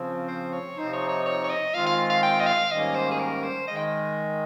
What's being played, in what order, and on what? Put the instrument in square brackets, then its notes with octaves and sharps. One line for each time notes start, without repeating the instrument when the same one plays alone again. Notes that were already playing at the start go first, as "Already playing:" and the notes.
Already playing: [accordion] C#3 F3 C4
[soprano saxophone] C5
C#5
[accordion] C3 F3 C4 D#4 [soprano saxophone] C5
[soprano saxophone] C#5
C#5
C#5
C#5
D#5
[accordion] D#3 G#3 C4 F4 [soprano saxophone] F5
[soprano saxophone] F5
F5
G5
D#5
F5
[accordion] G#2 D#3 G3 A#3 C#4 [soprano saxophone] D#5
[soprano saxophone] C5
G#4
A#4
C5
[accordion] D#3 G#3 [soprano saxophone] D#5
[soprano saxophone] G5